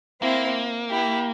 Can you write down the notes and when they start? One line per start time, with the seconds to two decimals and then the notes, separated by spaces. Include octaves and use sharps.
0.21 A#3 C4 E4
0.89 E4 G4